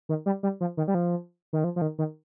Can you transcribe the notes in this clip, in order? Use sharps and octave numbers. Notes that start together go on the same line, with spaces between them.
D#3
G3
G3
F3
D#3
G3
F3
D#3
F3
F3
D#3
D#3